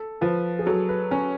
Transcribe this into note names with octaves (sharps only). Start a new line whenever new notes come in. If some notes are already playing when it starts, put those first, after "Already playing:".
Already playing: A4
F3 B4
G#4
F#3 A4
B4
C#4 C#5